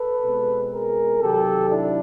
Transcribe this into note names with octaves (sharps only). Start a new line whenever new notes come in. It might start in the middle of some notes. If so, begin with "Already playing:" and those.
Already playing: A4 B4
B2 G#3 C4
G#4 A#4
C3 D#3 F#3 G4 A4
D4 E4